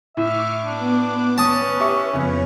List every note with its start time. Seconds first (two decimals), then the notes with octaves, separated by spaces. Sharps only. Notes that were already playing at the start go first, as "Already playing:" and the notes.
0.17 A2 E5 C#6 D6 F6
0.65 B3 D4 D6
1.38 C#4 B4 A5 D#6
1.80 G4 E5 C#6
2.13 F2 C#3 B3 C#5